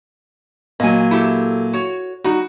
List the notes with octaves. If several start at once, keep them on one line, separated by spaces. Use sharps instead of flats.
A#2 F#3 D#5 G#5
E4 G4 A4
F#4 C#5
G3 D#4 F#4